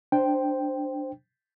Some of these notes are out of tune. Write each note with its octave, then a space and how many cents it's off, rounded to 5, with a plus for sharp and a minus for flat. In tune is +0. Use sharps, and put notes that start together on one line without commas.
D4 +0 C5 +0 G5 +0